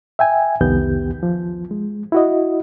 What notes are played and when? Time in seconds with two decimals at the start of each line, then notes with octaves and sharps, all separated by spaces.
0.19 E5 G5 G#5
0.61 C2 F2 D#3 B3 G4 G6
1.23 F3
1.71 G#3
2.12 E4 F#4 D#5